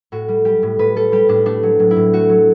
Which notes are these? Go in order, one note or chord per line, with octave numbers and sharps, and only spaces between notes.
A2 F#4
G3
G3 G4
A2
A2 B4
G3 A4
G3 G4
A2 D4
A3 D4
F#3
A2
E4
A2
A3 F#4
F#3